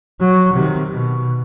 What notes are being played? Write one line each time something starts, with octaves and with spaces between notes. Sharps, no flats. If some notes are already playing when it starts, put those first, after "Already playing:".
F#3
C3 D#3
B2